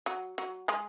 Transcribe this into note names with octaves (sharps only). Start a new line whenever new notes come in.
F#3 F#4
F#3 F#4
G#3 G#4